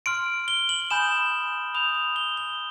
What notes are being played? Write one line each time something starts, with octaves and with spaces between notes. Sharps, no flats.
C6 F6 D7
G7
F#7
G#5 B5 D#6 G6 E7
B5 D#6 G6 F7
F7
G7
G7